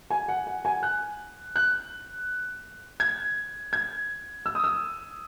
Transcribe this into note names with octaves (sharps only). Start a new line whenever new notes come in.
G#5
F#5
F#5
G#5
F#6
F#6
G#6
G#6
E6
D#6
E6